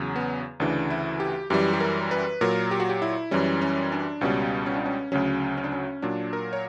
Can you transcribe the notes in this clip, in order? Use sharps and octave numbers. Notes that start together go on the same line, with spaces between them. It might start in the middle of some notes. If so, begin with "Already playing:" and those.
Already playing: E2 C#3 F#3
B3
D2 C#3 E3 D4
E4
G4
F#2 E3 G3 G4
G4
A#4
B4
A#2 F#3 A#4
G4
F#4
G4
E4
F#2 E3 G3 C#4
C#4
D4
C#2 B2 G3 C#4
C#4
D4
C#4
D2 C#3 F#3 C#4
C#4
D4
C#4
A#2 F#3 D4
A#4
C#5